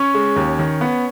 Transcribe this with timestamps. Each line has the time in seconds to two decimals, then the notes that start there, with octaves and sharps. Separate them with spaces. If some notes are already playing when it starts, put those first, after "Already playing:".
Already playing: C#4 C#5
0.14 G#3
0.36 D#2
0.59 D#3
0.81 B3